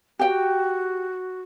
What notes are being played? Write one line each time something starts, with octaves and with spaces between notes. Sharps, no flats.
F#4 G4 G5